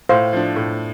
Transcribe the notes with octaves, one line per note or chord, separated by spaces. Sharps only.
A2 C5 F5
F3 D4
A2